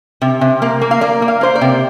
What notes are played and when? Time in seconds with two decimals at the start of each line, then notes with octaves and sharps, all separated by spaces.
0.22 C3
0.41 C3
0.62 A#3
0.81 A#3
0.91 F5
1.01 A#3 D5
1.22 A#3
1.28 F5
1.41 A#3 C5
1.55 D5
1.61 C3